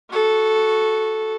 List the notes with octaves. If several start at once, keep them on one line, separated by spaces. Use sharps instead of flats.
F#4 A4